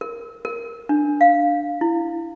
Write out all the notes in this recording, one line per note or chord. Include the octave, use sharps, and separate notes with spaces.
A#4
A#4
D4
F5
E4